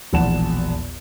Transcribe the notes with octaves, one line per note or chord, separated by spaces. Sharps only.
E1 A#1 E2 F#5 A5 E7